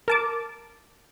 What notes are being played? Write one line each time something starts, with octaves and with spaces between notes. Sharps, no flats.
A#4 A5 D6